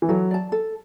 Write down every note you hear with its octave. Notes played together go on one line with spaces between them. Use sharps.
E3
F#3 A4
D5 A5
A4